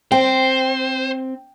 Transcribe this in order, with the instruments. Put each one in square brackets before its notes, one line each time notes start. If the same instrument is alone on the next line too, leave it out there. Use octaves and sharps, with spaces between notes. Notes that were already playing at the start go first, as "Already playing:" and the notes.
[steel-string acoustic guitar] C4 [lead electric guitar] C5 [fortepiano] G5